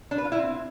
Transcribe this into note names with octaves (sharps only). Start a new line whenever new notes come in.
D4
B4
F4
E4
C4